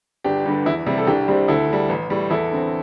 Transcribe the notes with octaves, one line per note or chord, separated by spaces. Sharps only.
G1 D4 G4
G2 D3 G3
E2 E4
C3 G3 E4
A4
C2 D4 G4
C3 G3 C4
D2 E4 A4
D3 G3
A1
A2 G3
E2 E4 A4
D3 C4